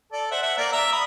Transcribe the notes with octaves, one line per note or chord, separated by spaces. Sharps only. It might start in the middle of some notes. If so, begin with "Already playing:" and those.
A4 D5
C5 E5 F#5
E5 F#5
A#3 A#4 D5
E5 A#5 E6
A#5 B5 D#6